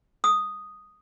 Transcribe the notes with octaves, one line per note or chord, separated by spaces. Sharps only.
D#6